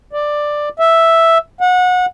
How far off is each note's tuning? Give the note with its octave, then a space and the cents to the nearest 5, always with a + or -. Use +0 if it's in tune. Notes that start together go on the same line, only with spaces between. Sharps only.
D5 +10
E5 +0
F#5 -25